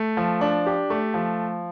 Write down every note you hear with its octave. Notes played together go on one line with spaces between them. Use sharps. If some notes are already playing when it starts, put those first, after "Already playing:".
Already playing: A3
F3
D4
G4
A3
F3